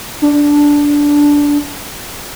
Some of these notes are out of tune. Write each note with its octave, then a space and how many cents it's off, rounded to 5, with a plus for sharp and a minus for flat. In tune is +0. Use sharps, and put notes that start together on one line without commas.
D4 -10